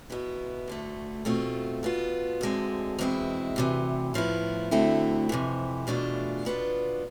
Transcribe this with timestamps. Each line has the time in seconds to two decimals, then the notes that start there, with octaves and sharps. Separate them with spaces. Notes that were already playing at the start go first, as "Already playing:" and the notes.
0.10 B2 B3 E4
0.68 D2 D3 A3
1.25 B2 A3 C4 F4
1.83 B2 B3 F4
2.41 D2 D3 G#3 C4
2.99 E2 B2 G#3 C4 E4
3.56 D2 C3 E3
4.14 A2 F3 B3 E4
4.71 D2 D3 A3 C4 E4
5.29 F2 C3 E3
5.87 E2 B2 A3 D4 F4
6.45 B2 B3 D4 F4